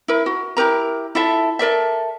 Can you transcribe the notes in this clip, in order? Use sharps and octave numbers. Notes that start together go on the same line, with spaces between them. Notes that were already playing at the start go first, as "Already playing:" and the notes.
E4 A#4
F#4
E4 G4 A#4 A#5
E4 F4 A4 E5
A4 A#4 D5 E5